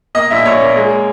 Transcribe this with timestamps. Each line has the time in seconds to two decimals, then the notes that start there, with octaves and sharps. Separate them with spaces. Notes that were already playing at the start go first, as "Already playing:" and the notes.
0.15 A#3 D#5
0.30 A#1 E5
0.45 A#1 C#5
0.61 A#3
0.76 G#3